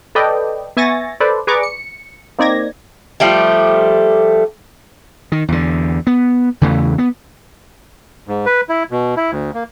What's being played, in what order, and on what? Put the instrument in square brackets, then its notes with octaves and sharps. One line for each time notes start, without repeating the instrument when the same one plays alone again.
[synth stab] A4 B4 D5 D#5 G5
B3 E5 G#5 C#6 A6 A#6
A4 B4 C5 D5
G#4 B4 D5 A#5 C#6 D6
C#7
A#3 C4 D#4 D5 G#6 A#6
[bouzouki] F3 G3 A3 G4
[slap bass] D#3
E2 D3
B3
E2 C#3 E3 A3
B3
[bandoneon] G#2
B4
E4
B2
E4
D2
A#3